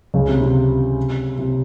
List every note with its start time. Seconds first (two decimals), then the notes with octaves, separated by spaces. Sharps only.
0.14 C#2 C#3
0.28 C3
0.42 C3
1.38 C3